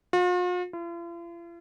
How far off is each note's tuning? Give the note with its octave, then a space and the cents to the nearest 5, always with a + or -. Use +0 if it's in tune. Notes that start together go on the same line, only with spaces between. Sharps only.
F4 +45
F4 -45